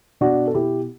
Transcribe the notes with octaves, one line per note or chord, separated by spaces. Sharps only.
B2 D4 F#4
A4
B2 E4 G4